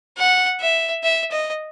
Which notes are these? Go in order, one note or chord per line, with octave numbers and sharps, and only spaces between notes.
F#5
E5
E5
D#5